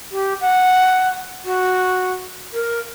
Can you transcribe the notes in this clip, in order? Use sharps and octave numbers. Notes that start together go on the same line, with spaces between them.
G4
F#5
F#4
A#4